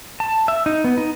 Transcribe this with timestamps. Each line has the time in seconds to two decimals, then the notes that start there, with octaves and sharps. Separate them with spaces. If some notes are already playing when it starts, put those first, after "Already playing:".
0.20 A5
0.48 E5
0.66 D#4
0.84 B3
0.98 D#4